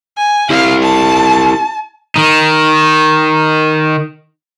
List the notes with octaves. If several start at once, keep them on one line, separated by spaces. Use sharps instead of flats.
G#5
E4 G4 F5
A5
D#3 D#4